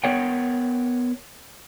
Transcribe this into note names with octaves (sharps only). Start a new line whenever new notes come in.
B3 A#4 C#5 F#5 G5